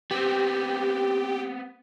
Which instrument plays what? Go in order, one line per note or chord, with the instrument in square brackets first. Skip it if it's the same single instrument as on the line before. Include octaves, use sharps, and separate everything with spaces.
[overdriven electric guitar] B3 C4 [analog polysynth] G4